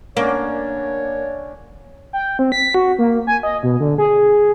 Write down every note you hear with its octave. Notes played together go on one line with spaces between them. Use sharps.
D3 A#3 C#4 D4 C#5
G5
C4
B6
F#4
A#3
G#5
D#5
B2
D3
G#4